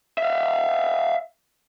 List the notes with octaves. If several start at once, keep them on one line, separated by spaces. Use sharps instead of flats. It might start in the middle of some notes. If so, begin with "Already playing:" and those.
E5 F5